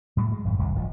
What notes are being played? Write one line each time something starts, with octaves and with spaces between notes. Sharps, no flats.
A2 F#3 G3
G#3
G#1 F#2
D#1 C2
D1 G1 F3